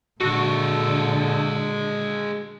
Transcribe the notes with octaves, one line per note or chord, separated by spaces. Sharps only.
A#2 D3 G#3 F#4 A4